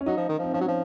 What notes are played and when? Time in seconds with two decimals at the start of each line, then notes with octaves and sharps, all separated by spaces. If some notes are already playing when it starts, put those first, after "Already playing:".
0.01 C#4
0.06 F#3 D#4
0.17 F3
0.29 D#3
0.39 F3 C4
0.54 F3 C#4
0.61 F#3
0.68 F3